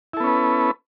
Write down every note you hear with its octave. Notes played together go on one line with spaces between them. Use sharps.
B3 C#4 E4 A4 B4